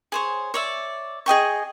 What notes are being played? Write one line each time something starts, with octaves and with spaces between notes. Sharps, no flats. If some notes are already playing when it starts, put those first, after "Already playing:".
G#4 C5 C#5
C#5 D5 E5
G#4 D#5 G5 C#6